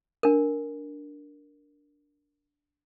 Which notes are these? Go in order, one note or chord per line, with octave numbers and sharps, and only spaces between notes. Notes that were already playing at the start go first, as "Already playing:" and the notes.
D4 A#4